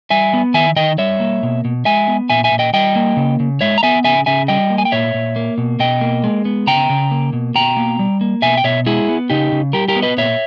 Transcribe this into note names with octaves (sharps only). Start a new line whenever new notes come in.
G3 E5 G#5
B3
D#3 E5 G#5
D#3 D#5 G5
G3 C#5 E5
A#3
B2
B2
G#3 E5 G#5
B3
A#2 E5 G#5
E5 G#5
A#2
D#5 G5
G3 D#5 G5
A#3
C#3
C#3
G#3 C#5 E5
A#5
B3 E5 G#5
C#3 E5 G#5
C#3 E5 G#5
G3 D#5 G5
A#3
G#5
G5
A#2 C#5 E5
A#2
A#3
B2
B2 D#5 G5
A#3
G#3
B3
C#3 G5 A#5
C#3
A#3
B2
B2 G5 A#5
A#3
G3
A#3
B2 E5 G#5
G5
B2 C#5 E5
G#3 E4 G#4
B3
C#3 D#4 G4
C#3
G3 G4 A#4
G4 A#4
B3
B4 D#5
A#2 C#5 E5